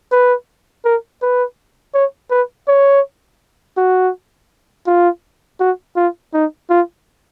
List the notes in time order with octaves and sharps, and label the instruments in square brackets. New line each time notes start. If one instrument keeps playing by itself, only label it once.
[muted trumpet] B4
A#4
B4
C#5
B4
C#5
F#4
F4
F#4
F4
D#4
F4